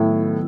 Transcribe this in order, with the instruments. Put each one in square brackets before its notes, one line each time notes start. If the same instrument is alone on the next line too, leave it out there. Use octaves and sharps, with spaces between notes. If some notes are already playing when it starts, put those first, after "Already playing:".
Already playing: [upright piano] A2 [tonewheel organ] D#3 F#3 B3 E4